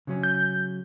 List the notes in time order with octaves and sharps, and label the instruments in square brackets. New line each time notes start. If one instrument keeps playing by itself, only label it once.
[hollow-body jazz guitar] C#3 F#3 C#4
[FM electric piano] G6